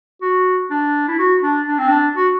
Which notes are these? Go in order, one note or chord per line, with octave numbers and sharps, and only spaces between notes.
F#4
D4
E4
F#4
D4
D4
C4
D4
F#4